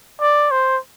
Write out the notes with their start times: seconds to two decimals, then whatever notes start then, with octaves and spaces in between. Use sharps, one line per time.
0.21 D5
0.51 C5